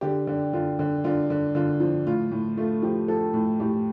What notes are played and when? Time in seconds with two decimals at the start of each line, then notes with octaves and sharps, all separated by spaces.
0.01 D3 G4
0.27 D3
0.53 D3 F4
0.79 D3
1.04 D3 F4
1.30 D3
1.55 D3 F4
1.80 F3
2.07 A2 F4
2.31 A2
2.57 A3 F4
2.82 F3 G4
3.08 F3 A4
3.34 A2
3.60 A2 G4